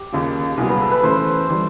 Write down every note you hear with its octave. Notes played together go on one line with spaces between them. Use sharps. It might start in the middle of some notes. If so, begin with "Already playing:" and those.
Already playing: G4
D#2 C#3 F3
C2 A#2 F#3 B3 G#4
B4
A4
B4
E3 A3 C#4 C5
E3 G3